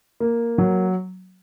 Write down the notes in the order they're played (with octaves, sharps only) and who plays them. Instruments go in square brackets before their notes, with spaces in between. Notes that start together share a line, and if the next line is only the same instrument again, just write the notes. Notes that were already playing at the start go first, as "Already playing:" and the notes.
[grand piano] A#3
F#3